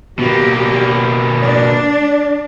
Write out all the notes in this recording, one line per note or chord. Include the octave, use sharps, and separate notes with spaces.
B2 A#3 G4
D4